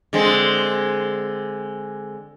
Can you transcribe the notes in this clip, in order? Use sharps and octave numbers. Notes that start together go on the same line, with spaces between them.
D3 G#3 C4